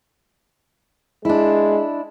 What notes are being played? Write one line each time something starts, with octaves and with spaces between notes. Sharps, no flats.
G#3 D4 E4